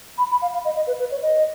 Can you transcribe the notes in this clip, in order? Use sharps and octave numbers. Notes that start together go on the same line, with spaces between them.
B5
B5
F5
F5
D#5
D#5
B4
B4
C#5
D#5